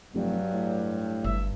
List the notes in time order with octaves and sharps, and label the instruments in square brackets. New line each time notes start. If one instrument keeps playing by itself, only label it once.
[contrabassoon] F1 [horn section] G2 [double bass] F#3
[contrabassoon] A2
[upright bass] G1 [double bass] G2 [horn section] E5